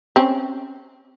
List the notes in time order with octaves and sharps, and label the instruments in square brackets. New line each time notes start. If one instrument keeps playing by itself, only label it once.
[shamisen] C4 C#4